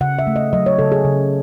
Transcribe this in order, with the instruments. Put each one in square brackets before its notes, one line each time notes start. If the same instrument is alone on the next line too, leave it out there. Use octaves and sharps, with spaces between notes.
[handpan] C#3 F#5
E5
A3
D#5
F#3 D#5
C#5
C#3 A4
G#4
C#3